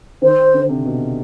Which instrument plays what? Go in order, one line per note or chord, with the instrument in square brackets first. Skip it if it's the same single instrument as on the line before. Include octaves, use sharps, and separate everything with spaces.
[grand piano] D#3 [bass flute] C5
[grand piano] D3
C3
B2